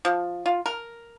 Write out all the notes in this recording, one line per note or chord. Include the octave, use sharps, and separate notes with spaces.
F3
F4
A#4